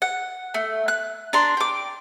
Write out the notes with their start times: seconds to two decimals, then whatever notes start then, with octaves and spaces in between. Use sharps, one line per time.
0.02 F#5
0.54 A3
0.88 F#6
1.33 D4 A#5 C6
1.57 G5 D6